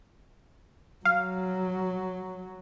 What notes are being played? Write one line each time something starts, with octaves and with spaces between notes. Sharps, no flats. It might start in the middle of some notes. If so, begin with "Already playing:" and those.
F#3 F5